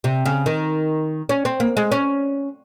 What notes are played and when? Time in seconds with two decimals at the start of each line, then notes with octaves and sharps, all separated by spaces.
0.04 C3
0.25 C#3
0.46 D#3
1.29 C#4
1.45 C4
1.60 A#3
1.77 G#3
1.92 C#4